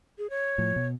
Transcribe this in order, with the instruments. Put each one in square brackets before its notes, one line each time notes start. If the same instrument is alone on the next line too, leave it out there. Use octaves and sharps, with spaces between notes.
[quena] G#4
C#5
[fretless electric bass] A2 F3
B2